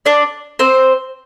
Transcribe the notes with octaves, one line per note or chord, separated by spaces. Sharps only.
D4 D5
C4 C5